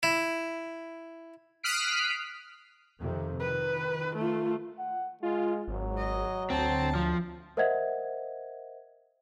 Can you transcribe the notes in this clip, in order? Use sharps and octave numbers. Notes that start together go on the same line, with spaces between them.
E4
D#6 F6 F#6 B6 C7 D7
F2 C3 D#3
D#3 B4
A3 F4
F#5
G#3 F4
G#1 F#3
D#5
D2 C4 A5
F3
A#4 C5 D#5 E5 F#5 G#6